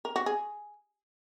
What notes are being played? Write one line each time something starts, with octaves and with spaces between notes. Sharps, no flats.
A#4
F#4
G#4